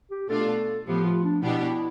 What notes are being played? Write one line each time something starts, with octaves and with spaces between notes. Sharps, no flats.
G4
B2 A3 D4 F4 A4
A2 F3 B3 G4
F4
D4
B2 B3 D4 E4 G4